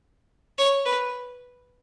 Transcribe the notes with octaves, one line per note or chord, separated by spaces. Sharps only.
C#5
B4